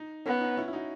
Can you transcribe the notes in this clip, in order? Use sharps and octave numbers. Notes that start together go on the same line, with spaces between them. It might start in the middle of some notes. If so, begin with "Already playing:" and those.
Already playing: D#4
B3 C#4
D#4
C#4 E4
E4
D#4 F#4